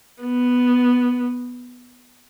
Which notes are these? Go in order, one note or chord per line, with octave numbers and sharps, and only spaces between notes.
B3